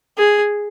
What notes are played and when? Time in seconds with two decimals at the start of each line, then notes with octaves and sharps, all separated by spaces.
0.18 G#4